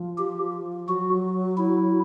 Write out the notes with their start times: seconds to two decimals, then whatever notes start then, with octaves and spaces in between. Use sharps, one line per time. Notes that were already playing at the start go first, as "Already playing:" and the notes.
Already playing: F3
0.18 G4
0.88 F#3 F#4
1.57 E4